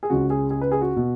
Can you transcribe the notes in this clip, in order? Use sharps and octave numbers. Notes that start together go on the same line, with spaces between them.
G#4
C#2 C#3 F#4
G#4
G#4
B4
G#4
F#4
B2